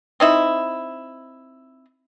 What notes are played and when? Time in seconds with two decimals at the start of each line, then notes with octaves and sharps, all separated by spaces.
0.20 C4 D#4 E4